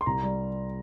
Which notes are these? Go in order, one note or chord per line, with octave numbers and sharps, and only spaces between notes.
C6
C2 A#5
G3